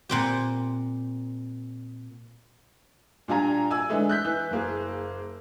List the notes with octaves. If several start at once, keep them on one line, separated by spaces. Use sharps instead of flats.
A#2 C4 G4
A#2 G3 D4 F4 G#5 A#5
D5 G#5 E6
D3 E3 G#3 A3
F#6 G6 B6
E3
F#1 A#3 G#4